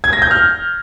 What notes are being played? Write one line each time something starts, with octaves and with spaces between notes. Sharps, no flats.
G#6
A#6
G6
F6